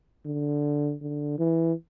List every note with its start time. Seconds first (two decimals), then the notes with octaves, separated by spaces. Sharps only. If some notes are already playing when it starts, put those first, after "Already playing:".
0.26 D3
1.02 D3
1.39 E3